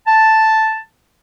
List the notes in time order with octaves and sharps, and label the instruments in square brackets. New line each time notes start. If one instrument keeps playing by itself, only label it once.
[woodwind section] A5